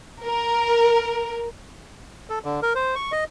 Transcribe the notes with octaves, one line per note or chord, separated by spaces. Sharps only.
A#4
A4
D3
A#4
C5
C#6
D#5